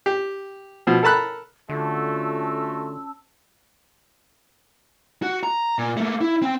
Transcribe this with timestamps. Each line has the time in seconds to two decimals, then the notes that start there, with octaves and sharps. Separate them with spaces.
0.06 G4
0.87 B2 F3
1.03 A4 A#4 A5 B5 F#6
1.70 D3 A3 C#4 F4 F#4 A5 E6
5.22 F#4
5.43 A#5
5.78 A#2
5.97 A3 A#3
6.21 E4
6.42 C4 G5